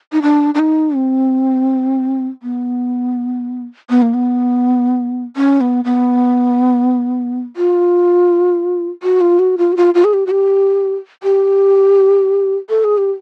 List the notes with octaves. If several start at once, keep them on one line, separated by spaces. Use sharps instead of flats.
D#4
D4
D4
D#4
C4
B3
B3
A#3
B3
C#4
B3
B3
F4
F#4
F4
F#4
F4
F#4
F4
F4
G#4
G4
F#4
G4
G4
A4
G#4
G4